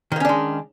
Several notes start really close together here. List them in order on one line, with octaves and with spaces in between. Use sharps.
D#3 A#3 C#4 D4 G#3